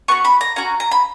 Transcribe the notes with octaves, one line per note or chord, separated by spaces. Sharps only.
B3 F#4 C#6
B5
A#5
C#4 F#4 A#5
A#5
B5